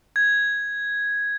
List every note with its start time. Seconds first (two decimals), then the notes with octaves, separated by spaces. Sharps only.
0.16 G#6